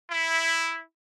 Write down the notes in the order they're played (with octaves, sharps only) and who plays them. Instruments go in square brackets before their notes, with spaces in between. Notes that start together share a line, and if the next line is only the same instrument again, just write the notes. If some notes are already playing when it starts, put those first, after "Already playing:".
[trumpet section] E4